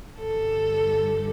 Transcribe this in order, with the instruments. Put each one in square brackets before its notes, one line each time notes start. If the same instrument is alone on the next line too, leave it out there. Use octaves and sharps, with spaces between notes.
[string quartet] G2 D3 G3 A4